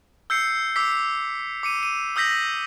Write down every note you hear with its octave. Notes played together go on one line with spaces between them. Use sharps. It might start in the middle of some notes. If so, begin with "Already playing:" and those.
E6 G6 C7 C#7
D6 E6 B6
D6 C#7 D#7
D#7
D#6 E6 G6 A#6 B6 F#7